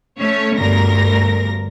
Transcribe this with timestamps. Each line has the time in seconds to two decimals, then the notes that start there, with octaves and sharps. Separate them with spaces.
0.19 A3 C#4 C#5
0.57 G1 D2 G2 A#4 A#6